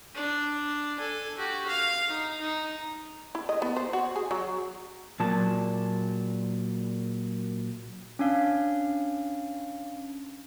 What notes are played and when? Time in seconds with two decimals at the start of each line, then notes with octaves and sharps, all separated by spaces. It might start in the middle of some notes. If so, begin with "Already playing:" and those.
0.15 D4
0.97 A4 G#5
1.38 F#4 G4
1.68 F5
2.07 D#4
2.40 D#4
3.35 E4
3.49 D#5
3.62 B3
3.76 C5
3.93 F#4
4.16 G#4
4.31 F#3
5.20 A#2 F#3 A5
8.19 C#4 D4 F5